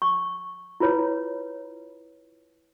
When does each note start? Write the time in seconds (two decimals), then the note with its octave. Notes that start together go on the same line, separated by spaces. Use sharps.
0.02 C#6
0.80 E4 F4 B4 C#5